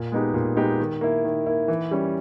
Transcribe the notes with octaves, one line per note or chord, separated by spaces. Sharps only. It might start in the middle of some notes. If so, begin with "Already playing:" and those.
Already playing: A#2
G#3 B3 D#4 G4
A#2
G#3 B3 D#4 G4
D#3
A#3 E4
D#3
A#3 E4
E3
G3 C#4